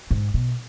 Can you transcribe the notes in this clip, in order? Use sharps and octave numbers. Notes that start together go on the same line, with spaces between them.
G#2
B2